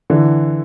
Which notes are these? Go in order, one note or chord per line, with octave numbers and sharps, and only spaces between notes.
D3 E3